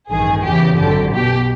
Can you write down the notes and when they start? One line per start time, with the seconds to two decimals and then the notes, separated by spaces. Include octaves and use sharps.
0.10 A1 G2 D#3 G#4
0.44 E2 C#3 E3 G4
0.78 G#1 F#2 D3 G4
1.12 B1 B2 G4